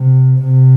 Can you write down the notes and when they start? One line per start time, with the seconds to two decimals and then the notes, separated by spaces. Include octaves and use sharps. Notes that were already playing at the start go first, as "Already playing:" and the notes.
Already playing: C3
0.38 C3